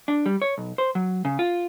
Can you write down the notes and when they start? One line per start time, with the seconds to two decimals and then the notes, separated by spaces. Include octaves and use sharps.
0.08 D4
0.26 G3
0.42 C#5
0.58 B1
0.78 C5
0.95 F#3
1.25 C#3
1.39 F4